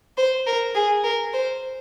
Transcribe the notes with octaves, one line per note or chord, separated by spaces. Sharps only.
C5
A#4
G#4
A#4
C5